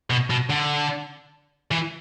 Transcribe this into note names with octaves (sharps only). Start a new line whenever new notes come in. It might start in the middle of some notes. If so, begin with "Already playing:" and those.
B2
B2
D3
E3